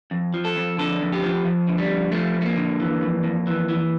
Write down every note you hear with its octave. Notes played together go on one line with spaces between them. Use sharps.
F2
F3
A4
F2
D3 A4
F2
G4
F3
F2
D3
G3
F2
F3 A3
F2
A3
A#3
D3
E3
F2
F2
E3
E3